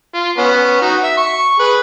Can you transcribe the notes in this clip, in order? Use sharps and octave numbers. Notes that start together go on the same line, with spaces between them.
F4
B3 C#4
D#4 F#4
E5
C#6
G#4 B4